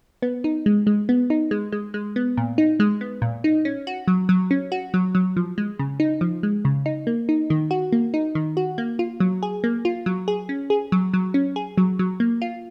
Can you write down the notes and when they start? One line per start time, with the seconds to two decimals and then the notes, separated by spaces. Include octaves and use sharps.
0.22 B3
0.44 D#4
0.66 G#3
0.87 G#3
1.09 B3
1.30 D#4
1.51 G#3
1.72 G#3
1.94 G#3
2.16 B3
2.37 A#2
2.58 D#4
2.80 G#3
3.01 B3
3.22 A#2
3.44 D#4
3.65 C#4
3.87 F#4
4.08 F#3
4.29 F#3
4.51 C#4
4.72 F#4
4.94 F#3
5.15 F#3
5.36 F3
5.58 G#3
5.79 C#3
6.00 D#4
6.21 F3
6.43 G#3
6.65 C#3
6.86 D#4
7.07 A#3
7.29 D#4
7.50 D#3
7.71 F#4
7.93 A#3
8.14 D#4
8.35 D#3
8.57 F#4
8.78 A#3
8.99 F4
9.20 F#3
9.43 G#4
9.64 A#3
9.85 F4
10.06 F#3
10.28 G#4
10.49 C#4
10.70 G#4
10.92 F#3
11.14 F#3
11.34 C#4
11.56 G#4
11.78 F#3
11.99 F#3
12.20 A#3
12.42 F4